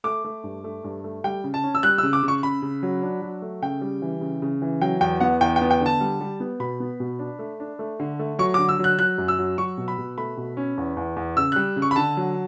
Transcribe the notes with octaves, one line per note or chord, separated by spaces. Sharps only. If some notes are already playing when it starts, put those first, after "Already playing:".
A3 D6
A3
G2
A3
G2
A3
G3 G5
C#3
A5
C#4
E6
G3 F#6
C#3 E6
D6
C#3
C#6
C#3 B5
C#3
F#3
D4
F#3
A3
C#3 G5
G3
E3
C#3
C#3
E3
F#3 G5
E2 G5
B3 F#5
E2 G5
G5
B3
G5
D3
A5
G3
G3
B3
B2 B5
B3
B2
D4
A3
D4
A3
D3
A3
F#3 C#6
D3 D6
E6
F#3
F#6
F#3 F#6
F#2
E6
F#3
F#3 C#6
B2
B5
B2
A3 B5
B2
C#4
E2
E2
E2
C#3 E6
G3 F#6
C#3
C#6
B5
D3 A5
F#3